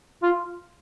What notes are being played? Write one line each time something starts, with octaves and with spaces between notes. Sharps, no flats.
F4